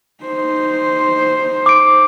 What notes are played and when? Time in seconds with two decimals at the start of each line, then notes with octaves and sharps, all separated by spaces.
0.24 D#4 C5
1.66 D6 D7